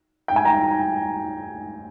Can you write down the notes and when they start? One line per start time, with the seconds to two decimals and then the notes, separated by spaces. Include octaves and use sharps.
0.28 G5
0.36 G#5
0.45 G5 A#5